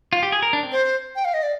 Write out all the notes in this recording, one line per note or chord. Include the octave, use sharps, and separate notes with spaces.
F4
G4
G#4
A#4
D4
C4
C5
G5
F5
D#5
D5